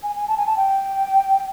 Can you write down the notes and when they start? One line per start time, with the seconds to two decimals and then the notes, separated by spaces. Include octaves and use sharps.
0.03 G#5
0.15 G#5
0.28 A5
0.37 G#5
0.47 A5
0.57 G5